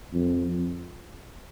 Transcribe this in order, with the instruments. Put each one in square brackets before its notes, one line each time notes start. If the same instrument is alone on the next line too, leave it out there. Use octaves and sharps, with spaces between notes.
[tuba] F2